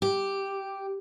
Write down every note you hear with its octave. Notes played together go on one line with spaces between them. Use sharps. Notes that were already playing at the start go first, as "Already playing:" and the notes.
G4